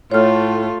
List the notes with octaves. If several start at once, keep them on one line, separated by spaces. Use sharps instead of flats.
A2 A3 F4 C#5 F6